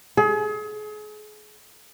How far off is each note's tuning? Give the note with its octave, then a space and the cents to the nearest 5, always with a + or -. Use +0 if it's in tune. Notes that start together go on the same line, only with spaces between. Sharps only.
G#4 +35